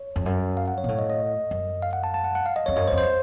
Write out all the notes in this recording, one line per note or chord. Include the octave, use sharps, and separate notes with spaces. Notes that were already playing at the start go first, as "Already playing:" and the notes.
Already playing: C#5
F2
F#2
F5
F#5
C#5
A#2
A2 C#5
D#5
D#5
F#2
F5
F#5
A5
A5
F#5
F#5
F5
D#5
F2 C#5
F#2 C#5
C5
F2
C5